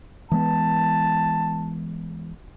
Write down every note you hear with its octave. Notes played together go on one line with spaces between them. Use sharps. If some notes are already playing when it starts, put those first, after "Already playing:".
E3 G#3 B3 A5